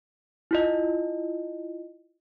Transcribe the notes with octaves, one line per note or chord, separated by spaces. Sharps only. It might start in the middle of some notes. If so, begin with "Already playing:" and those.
E4 F4 D#5